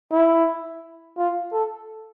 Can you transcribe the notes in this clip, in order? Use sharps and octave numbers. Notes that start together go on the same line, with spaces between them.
E4
F4
A4